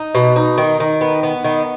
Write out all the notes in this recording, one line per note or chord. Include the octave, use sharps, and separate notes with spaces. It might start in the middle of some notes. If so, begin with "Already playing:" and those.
Already playing: D#4
B2
D#4
D#3
D#3
B3
B3
D#3